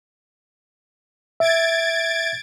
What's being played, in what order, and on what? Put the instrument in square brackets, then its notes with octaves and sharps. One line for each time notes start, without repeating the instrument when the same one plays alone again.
[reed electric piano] E5 [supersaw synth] G#6 A6 D7